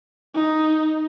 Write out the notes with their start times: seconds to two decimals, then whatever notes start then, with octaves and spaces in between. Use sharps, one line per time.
0.35 D#4